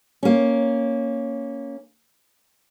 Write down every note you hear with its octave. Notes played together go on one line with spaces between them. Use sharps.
A#3 C#4